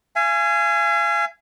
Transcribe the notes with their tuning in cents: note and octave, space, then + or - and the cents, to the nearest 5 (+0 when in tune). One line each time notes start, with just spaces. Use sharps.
F5 -40 G#5 +0